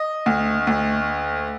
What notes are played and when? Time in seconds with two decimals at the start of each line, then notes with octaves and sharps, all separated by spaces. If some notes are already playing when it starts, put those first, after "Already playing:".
Already playing: D#5
0.26 D2
0.67 D2